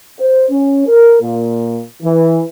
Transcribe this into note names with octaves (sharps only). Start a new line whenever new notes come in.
C5
C#4
A#4
A#2
E3